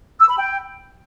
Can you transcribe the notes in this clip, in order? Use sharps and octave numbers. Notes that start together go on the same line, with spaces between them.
E6
B5
G5